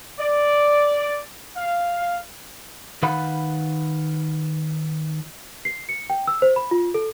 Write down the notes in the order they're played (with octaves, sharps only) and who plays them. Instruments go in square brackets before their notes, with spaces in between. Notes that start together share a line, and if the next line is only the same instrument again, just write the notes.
[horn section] D5
F5
[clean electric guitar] D#3 B4 F5 F#5 B5
[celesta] C7
C#7
G5
E6
C5
B5
F4
A4